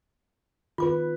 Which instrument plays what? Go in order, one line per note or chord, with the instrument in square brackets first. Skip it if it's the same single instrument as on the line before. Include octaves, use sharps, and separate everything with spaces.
[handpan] D#3 B4 [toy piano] F4 D6